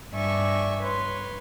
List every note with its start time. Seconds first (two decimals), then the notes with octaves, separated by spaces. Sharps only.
0.12 G2 D5 E5 G#5 C#6
0.81 B4 C#5 C6